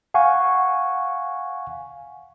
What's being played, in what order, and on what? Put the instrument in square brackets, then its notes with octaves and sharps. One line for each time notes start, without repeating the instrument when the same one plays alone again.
[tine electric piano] F5 F#5 G#5 C#6